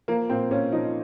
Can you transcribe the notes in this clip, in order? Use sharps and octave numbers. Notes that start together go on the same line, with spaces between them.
F3 A#3
A#2 C4
A#2 C#4
F3 D#4